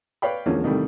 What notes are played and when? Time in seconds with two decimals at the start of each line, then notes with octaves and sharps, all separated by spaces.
0.22 B4 C#5 D5 F5 G5 B5
0.46 E2 D3 F3 G#3 A#3 C#4
0.64 C2 D#3 E3 G3 A3